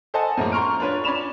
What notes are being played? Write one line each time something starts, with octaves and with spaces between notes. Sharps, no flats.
A4 C5 D#5 F#5 G#5 A5
F#2 A2 F3 F#3 G#3 A#3
A#5 C6 C#6 F6 D7
D4 F4 B4 C#5
C#4 D5 B5 E7 F7